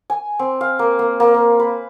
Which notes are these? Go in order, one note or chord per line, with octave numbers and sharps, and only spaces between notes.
G#5
C4
F5
A#3
A#3
A#3
A#3
B4